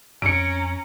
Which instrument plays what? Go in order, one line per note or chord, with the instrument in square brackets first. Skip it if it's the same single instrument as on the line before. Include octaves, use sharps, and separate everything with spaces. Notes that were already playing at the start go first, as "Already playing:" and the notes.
[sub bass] F2 [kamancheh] C#4 A#5 [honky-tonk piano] C#7 D7